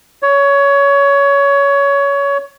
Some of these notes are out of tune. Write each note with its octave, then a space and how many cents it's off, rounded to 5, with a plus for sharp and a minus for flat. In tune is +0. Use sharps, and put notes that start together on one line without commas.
C#5 +20